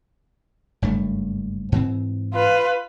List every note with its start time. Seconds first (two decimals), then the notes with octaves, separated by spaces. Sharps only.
0.82 F#1 G2 A3
1.72 G#2 E3 C4
2.34 F4 B4